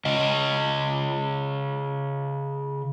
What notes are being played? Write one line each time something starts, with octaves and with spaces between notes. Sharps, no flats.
C#3 D#5